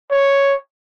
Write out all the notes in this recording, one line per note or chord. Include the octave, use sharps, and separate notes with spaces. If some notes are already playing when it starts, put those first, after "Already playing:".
C#5